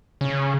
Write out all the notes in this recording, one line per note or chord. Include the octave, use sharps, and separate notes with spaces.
C#3